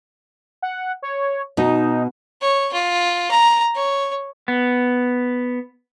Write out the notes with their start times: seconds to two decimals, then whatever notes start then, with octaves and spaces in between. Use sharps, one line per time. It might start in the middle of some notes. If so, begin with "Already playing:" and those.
0.62 F#5
1.02 C#5
1.57 B2 D#4
2.42 C#5
2.73 F4
3.31 A#5
3.75 C#5
4.48 B3